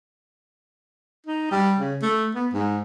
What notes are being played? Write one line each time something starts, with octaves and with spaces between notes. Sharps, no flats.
D#4
G3
C#3
A3
B3
G#2